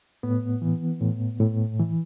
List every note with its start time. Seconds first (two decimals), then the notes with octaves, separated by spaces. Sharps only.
0.23 A2 B3
0.62 E3
1.01 A2
1.40 A2
1.80 E3